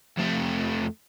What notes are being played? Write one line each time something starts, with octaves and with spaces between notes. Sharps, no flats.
F2 A3